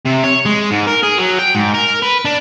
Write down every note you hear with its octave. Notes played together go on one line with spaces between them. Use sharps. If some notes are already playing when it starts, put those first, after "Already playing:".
C3
C#5
G#3
G#2
A#4
G#4
F#3
G5
G#2
A#4
B4
D4